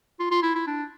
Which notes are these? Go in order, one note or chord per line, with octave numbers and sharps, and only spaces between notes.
F4
F4
E4
E4
D4